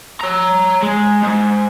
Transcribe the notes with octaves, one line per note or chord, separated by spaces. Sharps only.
C#5 A#5
G#3
G#2